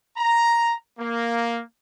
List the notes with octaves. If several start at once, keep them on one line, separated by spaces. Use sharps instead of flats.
A#5
A#3